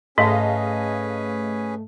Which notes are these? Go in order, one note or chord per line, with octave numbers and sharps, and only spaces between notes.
G#2 A3 C#4 G#4 B4 D#5 F5 A5